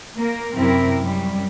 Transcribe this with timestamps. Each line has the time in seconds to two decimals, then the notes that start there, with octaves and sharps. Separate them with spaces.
0.17 A#3 A#4
0.54 F#2 C3 C4 E4 A#4
1.00 F#2 G3